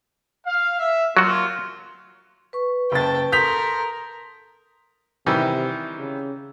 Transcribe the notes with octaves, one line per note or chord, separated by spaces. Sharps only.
F5
E5
F#3 A#3 F4 F#4
B4 C#6
F#1 G5 A5 A6
A4 A#4 C6 D#6 G6 B6 F7
C3 D#3 E3 G3
C#3